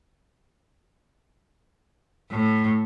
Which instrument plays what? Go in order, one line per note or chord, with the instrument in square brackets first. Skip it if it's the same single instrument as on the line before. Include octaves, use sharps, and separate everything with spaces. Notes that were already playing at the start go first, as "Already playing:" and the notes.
[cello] A2